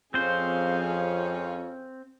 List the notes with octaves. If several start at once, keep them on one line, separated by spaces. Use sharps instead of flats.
F2 F3 C4 C#4 G#4 C5 F5